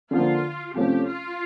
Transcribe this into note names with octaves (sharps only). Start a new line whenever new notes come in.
D3 F3 A#3 F4
C3 F3 A3 C#4 G4
F4